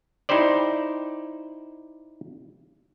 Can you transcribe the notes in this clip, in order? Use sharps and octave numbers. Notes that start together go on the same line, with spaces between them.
D#4 E4 G4 C5 D5